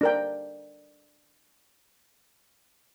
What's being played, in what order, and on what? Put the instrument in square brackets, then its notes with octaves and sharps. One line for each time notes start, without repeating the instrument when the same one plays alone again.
[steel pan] D4 A#4 G5